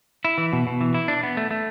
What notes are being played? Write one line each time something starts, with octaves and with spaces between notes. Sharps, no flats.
E4
E3
B2
B2
E3
E4
D4
B3
A3
A3